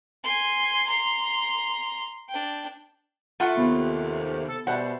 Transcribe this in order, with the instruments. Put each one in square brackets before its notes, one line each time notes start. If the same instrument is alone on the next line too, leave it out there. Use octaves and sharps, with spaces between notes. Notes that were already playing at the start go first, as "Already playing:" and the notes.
[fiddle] G#5 C6
A#5 C6
D4 G5
[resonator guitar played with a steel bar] A3 F4 F#5
[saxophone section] D#2 C3 [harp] B3
[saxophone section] A4
[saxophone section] B2 G3 [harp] C5 E5 A5 [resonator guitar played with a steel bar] F#5